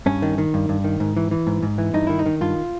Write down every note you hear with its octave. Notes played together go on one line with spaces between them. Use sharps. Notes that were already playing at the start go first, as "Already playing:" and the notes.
G2 C#4
D#3
D#3
G2
G2
D#3
G#2
E3
E3
G#2
G#2
E3
G2 D#4
D#3 E4
D#4
D#3
G2 F4